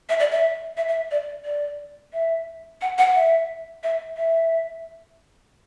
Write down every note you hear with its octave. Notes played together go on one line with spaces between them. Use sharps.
E5
D5
E5
E5
E5
D5
D5
E5
F#5
F#5
E5
E5
E5